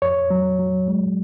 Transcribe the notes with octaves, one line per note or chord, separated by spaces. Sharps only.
F2 C#5
F#3
F#3
G#3